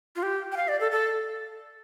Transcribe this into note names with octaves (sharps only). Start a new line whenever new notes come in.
F4
G4
G5
F5
D5
A4
A4